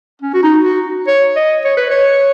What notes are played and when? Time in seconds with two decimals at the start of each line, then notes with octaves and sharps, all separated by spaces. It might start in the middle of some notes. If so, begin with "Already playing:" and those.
0.22 C#4
0.34 F#4
0.43 D#4
0.65 F#4
1.08 C#5
1.36 D#5
1.65 C#5
1.77 B4
1.91 C#5